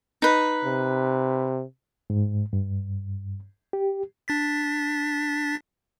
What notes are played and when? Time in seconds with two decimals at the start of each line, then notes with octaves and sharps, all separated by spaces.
0.22 D#4 B4
0.65 C3
2.10 G#2
2.53 G2
3.73 G4
4.28 D4 A6 B6